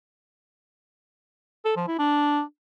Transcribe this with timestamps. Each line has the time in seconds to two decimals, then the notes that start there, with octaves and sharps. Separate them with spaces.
1.65 A4
1.76 F3
1.88 E4
1.99 D4